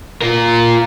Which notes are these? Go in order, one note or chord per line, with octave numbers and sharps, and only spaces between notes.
F4 A#4